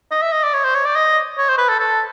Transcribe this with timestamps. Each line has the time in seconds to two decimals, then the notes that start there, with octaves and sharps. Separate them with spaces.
0.11 D#5
0.22 E5
0.32 D#5
0.44 D5
0.53 C#5
0.64 C5
0.75 C#5
0.85 D5
0.96 D#5
1.38 C#5
1.48 C5
1.58 B4
1.69 A4
1.80 A4